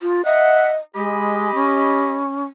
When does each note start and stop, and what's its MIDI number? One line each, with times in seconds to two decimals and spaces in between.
0.01 0.24 65
0.25 0.77 75
0.25 0.70 76
0.25 0.70 78
0.95 1.54 56
0.95 2.21 67
0.95 2.21 75
0.95 2.21 83
1.54 2.44 61